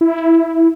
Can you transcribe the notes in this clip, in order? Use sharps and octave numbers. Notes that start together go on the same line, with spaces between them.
E4